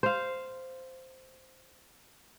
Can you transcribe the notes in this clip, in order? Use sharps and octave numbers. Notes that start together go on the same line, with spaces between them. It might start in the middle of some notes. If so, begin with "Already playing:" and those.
C5 F5